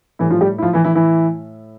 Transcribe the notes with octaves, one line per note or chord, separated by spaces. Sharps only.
A2 E3 G3 E4
F3 F4
G3 G4
E4
F3 F4
E3 E4
E3 E4
E3 E4